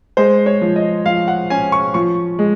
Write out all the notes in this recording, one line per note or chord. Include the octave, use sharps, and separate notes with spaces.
G#3 C5
C#5
F3
D#5
F3 F5
F#5
C#4 G#5
C#6
F3 C#6
G#3